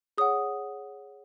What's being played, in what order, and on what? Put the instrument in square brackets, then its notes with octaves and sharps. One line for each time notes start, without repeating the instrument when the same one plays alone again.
[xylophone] G#4 C#5 F#5 D#6